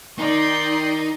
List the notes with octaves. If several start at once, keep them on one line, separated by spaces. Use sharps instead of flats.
D#3 D#4 D5 G5 C6